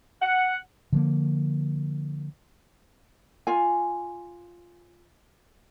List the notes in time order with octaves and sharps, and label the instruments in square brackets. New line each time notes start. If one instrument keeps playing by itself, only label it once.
[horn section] F#5
[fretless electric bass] D3 F3 A#3
[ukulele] F4 G#5